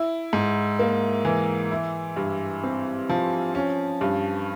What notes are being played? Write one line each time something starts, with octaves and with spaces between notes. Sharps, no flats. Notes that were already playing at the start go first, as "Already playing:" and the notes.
Already playing: E4
G#2
A#3
E3
E4
G2
C4
F3
C#4
G2